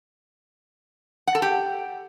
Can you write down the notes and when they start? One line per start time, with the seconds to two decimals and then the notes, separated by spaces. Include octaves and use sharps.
1.27 F#5
1.35 A4
1.42 G4